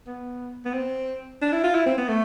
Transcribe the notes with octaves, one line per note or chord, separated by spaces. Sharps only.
B3
B3
C4
D4
E4
F4
E4
C4
B3
A3